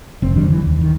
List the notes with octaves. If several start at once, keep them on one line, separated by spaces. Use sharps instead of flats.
F1 C4
D#3 F#3 G3 D4
D3 E3
D#2
D#3